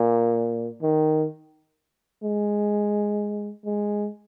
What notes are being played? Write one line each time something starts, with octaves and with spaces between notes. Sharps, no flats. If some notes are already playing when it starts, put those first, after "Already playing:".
Already playing: A#2
D#3
G#3
G#3